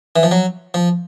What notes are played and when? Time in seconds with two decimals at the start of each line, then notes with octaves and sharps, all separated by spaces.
0.16 E3
0.23 F3
0.31 F#3
0.74 F3